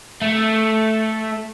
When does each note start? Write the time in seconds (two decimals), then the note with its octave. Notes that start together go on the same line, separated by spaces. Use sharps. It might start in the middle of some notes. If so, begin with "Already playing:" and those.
0.22 A3